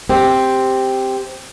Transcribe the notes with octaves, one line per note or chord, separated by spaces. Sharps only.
C4 G4